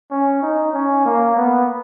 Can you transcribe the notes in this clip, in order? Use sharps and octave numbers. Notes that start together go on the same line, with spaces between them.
C#4
D#4
C#4
A#3
B3